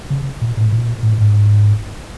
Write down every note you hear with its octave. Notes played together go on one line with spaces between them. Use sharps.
C#3
A#2
A2
A#2
A2
G#2